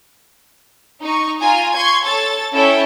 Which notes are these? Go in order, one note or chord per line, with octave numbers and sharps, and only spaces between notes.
D#4 C#6
F4 G#5 A#5
C6 C#6 G#6
A4 C#5 A6
C#4 E4 A4 C#5 E5 G5